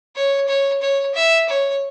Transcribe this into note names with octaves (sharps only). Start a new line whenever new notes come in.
C#5
C#5
C#5
E5
C#5